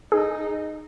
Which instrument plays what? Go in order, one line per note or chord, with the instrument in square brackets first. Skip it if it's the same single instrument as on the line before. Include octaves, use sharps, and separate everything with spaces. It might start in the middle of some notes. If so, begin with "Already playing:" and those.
[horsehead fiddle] D#4 [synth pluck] G#4